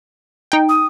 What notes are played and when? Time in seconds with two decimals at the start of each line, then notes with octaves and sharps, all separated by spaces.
0.52 D#4 G5
0.69 D#6